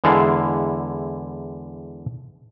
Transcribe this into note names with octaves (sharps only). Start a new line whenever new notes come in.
E2 D3 G#3 E4 F5 A5